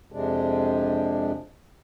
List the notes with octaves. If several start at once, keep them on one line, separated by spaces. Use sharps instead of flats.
F2 C3 G#3 D4